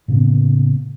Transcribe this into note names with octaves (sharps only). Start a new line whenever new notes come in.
A2 C#3 A#3 B3